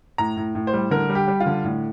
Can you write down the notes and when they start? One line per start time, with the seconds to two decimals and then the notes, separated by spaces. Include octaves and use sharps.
0.18 A2 A#5
0.37 A2
0.55 A2
0.67 C5
0.73 G3
0.91 D3 A#4
1.09 G3
1.15 G4
1.28 G3
1.40 F4
1.46 D3
1.64 A2